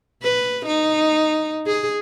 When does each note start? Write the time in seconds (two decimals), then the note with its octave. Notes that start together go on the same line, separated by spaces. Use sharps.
0.23 B4
0.66 D#4
1.67 G#4